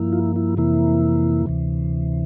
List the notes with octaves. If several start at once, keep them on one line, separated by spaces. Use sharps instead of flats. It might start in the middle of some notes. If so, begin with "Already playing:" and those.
Already playing: G2 F3 A#3 E4
F4
E4
F2 C3 E3 A#3 E4
D2 C3 E3